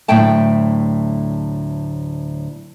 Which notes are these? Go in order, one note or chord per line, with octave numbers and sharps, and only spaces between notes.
D2 A2 F#3 E5 G5 A5